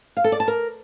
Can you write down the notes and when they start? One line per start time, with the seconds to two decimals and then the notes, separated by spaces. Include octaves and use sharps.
0.17 F5
0.24 A4
0.32 D5
0.40 A5
0.48 A#4